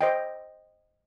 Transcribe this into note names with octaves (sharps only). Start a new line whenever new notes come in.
C5 D#5 G5